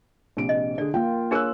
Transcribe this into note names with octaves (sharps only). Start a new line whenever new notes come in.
A#1 C3 D7
D#5
D3 G#4 D5
A#3 F4 G5
D4 G#4 A#4 C#5 E6 F#6